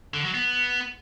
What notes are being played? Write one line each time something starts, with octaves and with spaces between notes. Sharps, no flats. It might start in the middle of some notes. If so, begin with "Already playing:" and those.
D3
F#3
B3